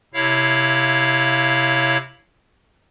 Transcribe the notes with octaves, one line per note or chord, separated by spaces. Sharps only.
C3 E4 C#5 F5